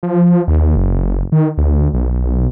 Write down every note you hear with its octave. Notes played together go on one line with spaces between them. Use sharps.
F3
D#2
F#1
D#3
D2
B1